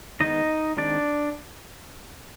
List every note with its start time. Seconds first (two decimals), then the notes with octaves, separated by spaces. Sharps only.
0.20 D#3 G#3 B3 D#4 D#5
0.77 D#3 G#3 C4 D4 D5